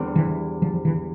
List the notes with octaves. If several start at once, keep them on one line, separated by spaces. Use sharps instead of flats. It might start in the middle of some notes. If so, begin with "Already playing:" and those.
Already playing: E2 D3 G3 C4
E3
F3
E3